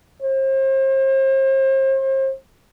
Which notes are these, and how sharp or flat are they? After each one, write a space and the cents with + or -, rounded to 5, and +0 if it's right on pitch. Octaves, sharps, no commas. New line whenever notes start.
C5 +35